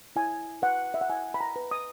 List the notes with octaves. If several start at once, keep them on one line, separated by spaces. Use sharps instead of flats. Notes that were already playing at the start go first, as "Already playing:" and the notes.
E4 G#5
B4 F#5
E5
F#5
E4 G#5
B5
A#5
B4
D#6